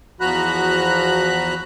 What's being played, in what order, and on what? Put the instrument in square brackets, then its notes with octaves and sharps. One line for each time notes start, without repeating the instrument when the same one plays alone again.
[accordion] E2 F3 F#4 A#5 B5 F#6